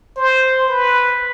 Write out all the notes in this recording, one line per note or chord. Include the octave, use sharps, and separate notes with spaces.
C5
B4